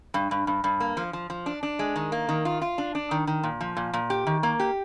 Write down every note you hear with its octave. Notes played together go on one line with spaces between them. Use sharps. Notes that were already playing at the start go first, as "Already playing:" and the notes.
G2
G2
G2
G2
A#3
F3
F3
F3
D4
D4
G#3
D#3
A#3
D#3
F4
F4
D4
D4
D#3
D#3
A#2
F3
A#2
A#2
G4
D#3
A#3
G4